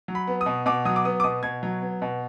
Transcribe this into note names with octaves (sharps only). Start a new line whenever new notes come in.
F#3
B5
B3
D#6
B2
B2 D6
F#3 D#6
D6
B3 D#6
D6
B2 D#6
B2 G#6
F#3
B3
B2